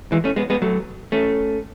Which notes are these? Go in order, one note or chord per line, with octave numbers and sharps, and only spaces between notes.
E3 G#3
A3 C#4
G#3 B3
G#3 B3
F#3 A3
A3 C#4